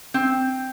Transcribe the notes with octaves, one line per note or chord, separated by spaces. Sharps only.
C4